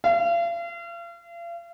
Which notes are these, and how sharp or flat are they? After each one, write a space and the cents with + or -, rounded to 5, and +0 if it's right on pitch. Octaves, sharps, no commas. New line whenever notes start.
F5 -40